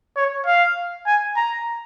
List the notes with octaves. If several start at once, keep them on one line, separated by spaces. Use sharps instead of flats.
C#5
F5
G#5
A#5